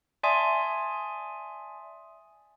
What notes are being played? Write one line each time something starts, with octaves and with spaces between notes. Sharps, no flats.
D5 E5 G#5 A5 C6 D#6